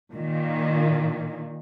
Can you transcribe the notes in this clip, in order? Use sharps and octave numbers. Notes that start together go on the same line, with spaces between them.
A#2 D#3